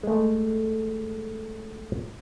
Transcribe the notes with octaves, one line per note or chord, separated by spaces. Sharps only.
G#3 A3